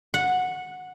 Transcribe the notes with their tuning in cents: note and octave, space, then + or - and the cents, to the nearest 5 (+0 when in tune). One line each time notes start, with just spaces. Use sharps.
F#5 -10